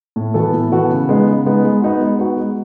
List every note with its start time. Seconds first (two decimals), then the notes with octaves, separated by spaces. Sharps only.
0.16 A2
0.34 E3 B3 F#4 A4
0.53 A2
0.72 E3 B3 F#4 A4
0.91 C#3
1.09 G#3 B3 D#4
1.27 C#3
1.46 G#3 B3 D#4
1.64 G#3
1.82 B3 D#4 F#4
2.00 G#3
2.19 B3 D#4 F#4
2.37 G#3